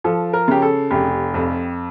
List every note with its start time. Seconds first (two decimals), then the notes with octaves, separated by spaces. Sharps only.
0.04 F3 A4
0.33 A#4
0.48 C#3 G4
0.62 A4
0.91 F1 G4
1.34 F2